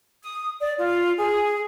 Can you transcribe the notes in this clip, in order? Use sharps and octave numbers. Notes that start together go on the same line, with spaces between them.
D#6
D5
F4
G#4